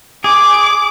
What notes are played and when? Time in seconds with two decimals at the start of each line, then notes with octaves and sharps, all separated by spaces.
0.24 G#4 D6